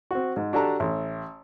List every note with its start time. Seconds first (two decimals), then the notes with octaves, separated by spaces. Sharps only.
0.11 C4 F#4
0.36 G#2
0.53 D4 F#4 G4 A4 A5 A#5
0.80 A1